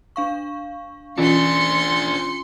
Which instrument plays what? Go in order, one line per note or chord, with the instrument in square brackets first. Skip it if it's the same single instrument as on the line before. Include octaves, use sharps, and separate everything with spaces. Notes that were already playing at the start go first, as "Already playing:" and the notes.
[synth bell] D4 F5 C#6
[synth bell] E3 C#4 F4 [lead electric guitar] D4 G#4 [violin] C6 C#7